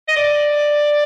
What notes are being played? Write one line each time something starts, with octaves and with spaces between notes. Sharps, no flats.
D#5
D5